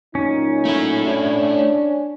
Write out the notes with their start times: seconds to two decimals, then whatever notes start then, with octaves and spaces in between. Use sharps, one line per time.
0.15 A#2 F#3 C#4 D#4
0.65 A3 E4
1.07 D4 C#5